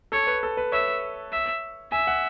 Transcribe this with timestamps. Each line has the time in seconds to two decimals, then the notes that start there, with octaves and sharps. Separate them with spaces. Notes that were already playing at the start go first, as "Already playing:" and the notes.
0.12 A4 C#5
0.27 B4
0.43 A4
0.57 B4
0.72 C#5 E5
1.32 E5
1.92 E5 G#5
2.07 F#5